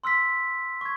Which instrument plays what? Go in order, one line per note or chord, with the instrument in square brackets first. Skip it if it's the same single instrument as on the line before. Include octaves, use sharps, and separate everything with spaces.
[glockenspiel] C6 E6 F6 B6
C#6 G#6